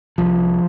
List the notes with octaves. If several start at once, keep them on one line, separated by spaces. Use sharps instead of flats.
C2 F3